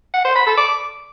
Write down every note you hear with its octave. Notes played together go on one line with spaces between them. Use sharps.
F#5
C5
B5
A4
D6